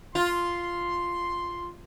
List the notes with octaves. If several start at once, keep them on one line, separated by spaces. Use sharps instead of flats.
F4 C6